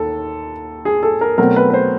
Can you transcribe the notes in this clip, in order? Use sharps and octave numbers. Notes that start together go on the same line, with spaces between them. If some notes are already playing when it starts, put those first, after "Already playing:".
Already playing: D#2 A4
G#4
A4
A#4
B2 F#3 A3 C4 A#4
B4
B4
C5